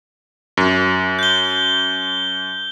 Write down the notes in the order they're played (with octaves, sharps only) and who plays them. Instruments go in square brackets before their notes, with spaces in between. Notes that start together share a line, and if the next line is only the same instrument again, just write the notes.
[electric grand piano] F#2
[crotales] G6 G7